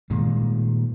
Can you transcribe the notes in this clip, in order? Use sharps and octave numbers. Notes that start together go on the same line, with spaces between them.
A#2 D#3 G#3